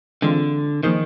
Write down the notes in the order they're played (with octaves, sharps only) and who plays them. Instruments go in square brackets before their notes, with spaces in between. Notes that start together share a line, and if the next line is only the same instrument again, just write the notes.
[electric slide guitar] D3 [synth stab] E3 G#3 C4 F4
[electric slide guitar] D#3 [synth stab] F3 A#3 D#4 G#4 C5